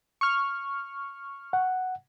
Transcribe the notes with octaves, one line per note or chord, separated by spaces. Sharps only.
C#6 F6
F#5